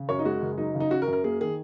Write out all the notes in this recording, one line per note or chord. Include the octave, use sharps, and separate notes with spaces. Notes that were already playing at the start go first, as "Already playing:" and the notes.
Already playing: C#3
F#2 C#5
D#4
G#3 F#4
F#1
F#3 D#4
C#3
D#4
C#4 F#4
A#4
F#2
A#4
A#3 G#4
D#3 G#4